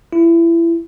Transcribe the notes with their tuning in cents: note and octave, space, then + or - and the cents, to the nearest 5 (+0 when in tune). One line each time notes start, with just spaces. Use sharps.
E4 +25